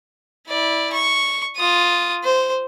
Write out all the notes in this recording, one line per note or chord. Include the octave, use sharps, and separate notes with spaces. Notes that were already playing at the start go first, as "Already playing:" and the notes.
E4 D5
C#6
F4 D#6
C5